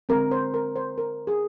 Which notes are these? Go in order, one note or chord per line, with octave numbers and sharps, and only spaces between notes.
D3 G#3 C4 A#4
C5
A#4
C5
A#4
G#4